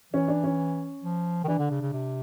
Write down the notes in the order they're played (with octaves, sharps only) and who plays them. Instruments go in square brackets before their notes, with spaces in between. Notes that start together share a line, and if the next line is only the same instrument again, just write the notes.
[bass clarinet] E3 [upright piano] C#4
[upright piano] D4
C#4
[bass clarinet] F3
D#3
[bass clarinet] E3 [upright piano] D4
[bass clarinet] D3
C#3
C#3
C3